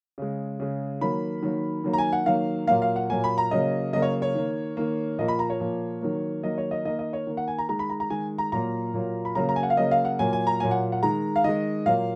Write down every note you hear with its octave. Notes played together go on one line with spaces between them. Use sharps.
C#3 G#3
C#3 G#3
D#3 F#3 A#3 B5
D#3 F#3 A#3
D#3 F#3 A#3
A#5
G#5
F#5
D#3 F#3 A#3 F5
A#2 F#3 A#3 F5
F5
F#5
A#2 F#3 A#3 G#5
B5
A#5
C#3 F#3 A#3 D#5
C#3 F#3 A#3 D#5
C#5
C#5
D#3 A#3
D#3 A#3
A#2 F3 A#3 D#5
B5
A#5
C#5
A#2 F3 A#3
D#3 F#3 A#3
D#3 F#3 A#3 D#5
C#5
D#5
D#3 A#3 D#5
D#5
C#5
D#3 A#3
F#5
G#5
A#5
D#3 G#3 A#5
B5
A#5
A#5
D#3 G#3 G#5
A#5
A#2 F#3 A#3 A#5
A#2 F#3 A#3
B5
C#3 F#3 A#3 A#5
A#5
G#5
F#5
F5
C#3 F#3 A#3 D#5
F5
F#5
A#2 F#3 A#3 G#5
G#5
A#5
A#2 F#3 A#3 G#5
F#5
F#5
D#3 G#3 A#5
F5
D#3 G#3 D#5
A#2 F#3 A#3 F5